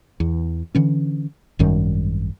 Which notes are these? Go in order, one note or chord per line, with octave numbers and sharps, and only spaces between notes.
E2
D3 E3 C#4
G#1 F#2 D#3 G3